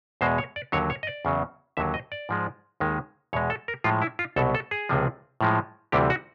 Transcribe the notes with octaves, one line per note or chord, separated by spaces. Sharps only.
E2 B2 G#3 C5
C#5
D5
D#2 D3 F#3 C#5
C#5
D#5
D5
E2 C#3 F#3
D#2 D3 F#3 E5
D#5
D5
G#2 F3 G#3
D#2 D#3 G#3
E2 B2 G#3 C#5
A4
A#4
A2 F3 G#3 F4
E4
F4
C2 B2 F#3 A4
A4
G#4
C#2 C3 F3
A2 F3 G#3
D2 C3 E3 G3 G4
F#4